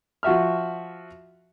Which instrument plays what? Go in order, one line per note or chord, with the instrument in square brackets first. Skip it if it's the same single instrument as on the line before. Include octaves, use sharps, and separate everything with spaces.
[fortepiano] F3 F#4 E5 F6